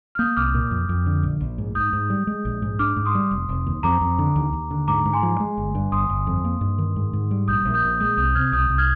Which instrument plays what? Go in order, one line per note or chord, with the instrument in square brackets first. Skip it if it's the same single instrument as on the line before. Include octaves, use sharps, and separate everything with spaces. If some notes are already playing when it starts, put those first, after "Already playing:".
[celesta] F6
[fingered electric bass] A#3 [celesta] D#6 G6
[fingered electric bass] C2 [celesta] D6 F6
[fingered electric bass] A#2
F2
F2
D3
A#1
A#1
G#2
[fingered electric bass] G#2 [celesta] D#6 G6
[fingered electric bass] G#2
G3
G#3
A#1
G#2
[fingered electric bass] D4 [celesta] D6 F6
[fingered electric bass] G#2
[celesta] C6 D#6
[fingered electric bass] G3
F1
F1
D#2
[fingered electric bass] F2 [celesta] A#5 D6
[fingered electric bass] F2
D3
D#2
D#2
D3
[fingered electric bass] G#2 [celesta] A#5 D6
[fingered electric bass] G#2
[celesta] G#5 C6
[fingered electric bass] F3
G#3
G1
G2
[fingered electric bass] G1 [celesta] C6 D#6
[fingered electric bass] G1
F2
A#3
G2
D#3
G#2
G#2
G3
[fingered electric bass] A#1 [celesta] D#6 G6
[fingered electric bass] A#1
[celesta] D#6 G6
[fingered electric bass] A#2
[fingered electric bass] G#3 [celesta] D#6 G6
[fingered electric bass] C2 [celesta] D#6 G6
[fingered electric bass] C3 [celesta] F6 G#6
[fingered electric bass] C2 [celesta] D#6 G6
[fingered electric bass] C2
[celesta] F6 G#6